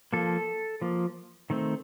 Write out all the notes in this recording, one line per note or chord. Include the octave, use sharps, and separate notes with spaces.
F3 A#3 A4
F3 A#3
D#3 A3 C4